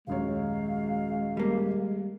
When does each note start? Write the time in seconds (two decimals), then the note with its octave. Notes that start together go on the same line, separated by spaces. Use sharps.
0.07 D#1 F#2 G#3 C#5 F5
1.37 G3 A#3